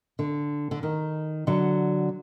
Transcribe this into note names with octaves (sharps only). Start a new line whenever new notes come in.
D3
D3
D#3
D3 F#3